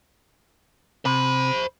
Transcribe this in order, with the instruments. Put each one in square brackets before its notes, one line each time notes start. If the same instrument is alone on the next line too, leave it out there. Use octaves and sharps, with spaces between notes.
[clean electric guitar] C3 [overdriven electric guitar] C5 B5